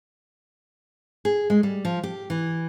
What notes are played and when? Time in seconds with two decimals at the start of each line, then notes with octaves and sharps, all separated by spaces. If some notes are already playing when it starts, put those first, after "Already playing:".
1.25 G#4
1.50 G#3
1.63 G3
1.85 F3
2.04 G4
2.30 E3